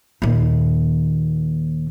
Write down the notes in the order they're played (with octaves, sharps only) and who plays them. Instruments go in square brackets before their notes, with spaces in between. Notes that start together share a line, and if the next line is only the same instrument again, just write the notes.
[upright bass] D#2 A#2